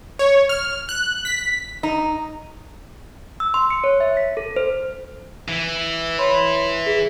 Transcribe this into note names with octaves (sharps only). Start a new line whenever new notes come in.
C#5
F6
F#6
B6
D#4
E6
C6
C#7
C#5
E5
B6
A4
C5
E3
C#5 B5 C6
G#4 B6